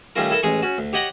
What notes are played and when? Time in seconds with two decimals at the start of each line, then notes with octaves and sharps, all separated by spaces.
0.16 D#3 G3 A3 C#4 F4 A#4
0.31 E4 A4 A#4
0.43 A1 G#3 G#4 C#6
0.63 C#4 F#4
0.78 D2
0.93 G4 C#5 D#5 F#5 G5 A#5